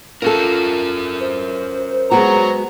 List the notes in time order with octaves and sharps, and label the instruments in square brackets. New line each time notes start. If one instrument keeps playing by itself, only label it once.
[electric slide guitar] C#4 A#4 [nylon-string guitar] F4 A4
[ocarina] C5
[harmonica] F#3 A#5 [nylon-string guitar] G#3 B3 F#4